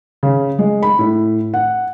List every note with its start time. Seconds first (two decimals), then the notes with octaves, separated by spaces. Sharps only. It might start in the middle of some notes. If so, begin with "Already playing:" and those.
0.23 C#3
0.59 G#3
0.83 B5
0.99 A2
1.54 F#5